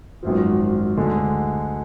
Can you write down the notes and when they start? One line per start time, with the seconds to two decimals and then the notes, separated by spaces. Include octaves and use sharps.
0.23 G#1 F#2 F3
0.97 D2 D3 G#3